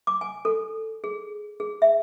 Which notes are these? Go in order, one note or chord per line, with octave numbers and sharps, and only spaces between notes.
D6
G#5
A4
G#4
G#4
E5